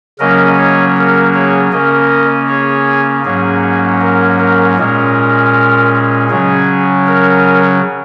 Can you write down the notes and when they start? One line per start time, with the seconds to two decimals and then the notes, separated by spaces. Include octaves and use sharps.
0.19 C#3 F#3 A#3 C#4 A#4 D#5
0.58 G#4 C#5
0.97 A#4
1.34 G#4 C#5
1.72 C#3 A#3 C#4 A#4 D#5
2.48 G#4 C#5
3.24 G#2 F#3 A#3 C#4 G#4
4.01 A#4
4.39 A#4
4.77 A#2 G#3 C#4 A#4
6.30 C#3 F#3 C#4 G#4
7.07 A#4